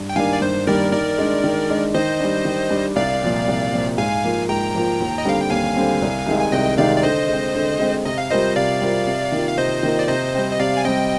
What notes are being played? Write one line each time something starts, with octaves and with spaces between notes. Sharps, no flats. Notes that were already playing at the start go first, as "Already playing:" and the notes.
Already playing: G2
G5
D#3 G3 A#3 D4 F5 G#5
D5
G2 C5
D#3 G3 A#3 D4 A#4 D5
D#3 A#4 D5
G#3 D4
D#3
G#3 D4
D#3 C5 D#5
G3 D4
D#3
G3 D4
C2 D5 F5
A#2 F3 C4
C2
A#2 F3 C4
G#2 F5 G#5
F3 A#3 F4
G#2 G5 A#5
F3 A#3 F4
D#2
D#5
D3 G3 C4 F5
G5
D#2 F5 G#5
D3 G3 C4
C2
C3 D#3 G#3
G#5
C2 D#5 G5
C3 D#3 G#3 D5 F5
D5
D3 C5 D#5
G#3
C4
D3
G#3 C4
C3 D#5
F5
G3 C4 F4 A#4 C5 D#5
C3 D5 F5
G3 C4 F4 A#4
C3
D#3 A#3 F4
F5
C3 C5 D#5
D#3 A#3 F4
D5
C3 C5 D#5
G3 C4
D#5
C3 D5 F5
G#5
G3 C4 D#5 G5